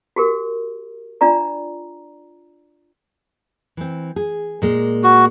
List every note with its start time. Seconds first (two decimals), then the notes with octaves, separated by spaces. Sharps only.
0.16 F#4 G4 A#4
1.21 D4 F4 D5 A#5
3.77 E3 C4
4.16 G#4
4.62 A#2 G#3 A#3
5.04 F#4